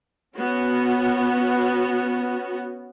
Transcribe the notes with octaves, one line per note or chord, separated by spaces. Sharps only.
B3 C#4 F#4